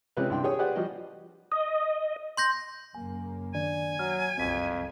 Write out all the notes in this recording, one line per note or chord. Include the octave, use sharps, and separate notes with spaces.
C3 G#3 C4 C#4 F4 B4
C2 G2 C4 D4 G5 C6
G4 G#4 C#5 G5 D#6
G4 G#4 B4 C5 D5 F#5
F3 G3 F#4 D#5
D#5
C6 G6 A#6
F#2 C#3 A#3 G#5
D#3 D4 D5 G#5
F#3 F6
F#1 C2 F2 C4 B6